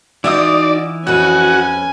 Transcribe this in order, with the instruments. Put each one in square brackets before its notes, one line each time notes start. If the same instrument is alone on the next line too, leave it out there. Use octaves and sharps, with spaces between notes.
[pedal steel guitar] E3 E5 D#6 [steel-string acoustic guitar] D#4 F4 F#4 [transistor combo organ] D5
[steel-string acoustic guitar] F2 B4 [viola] C#4 G#5 [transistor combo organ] F#4